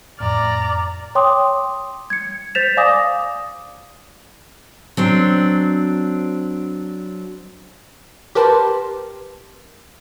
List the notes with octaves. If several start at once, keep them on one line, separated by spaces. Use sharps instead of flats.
F2 A2 D5 A#5 F6
C#5 G5 C6 D6 D#6
G#6 C#7
C5 G6 A6 B6 E7 F7
D5 F5 G#5 D6 D#6 A#6
F#3 C4 D4
G4 A#4 B4 A5 C6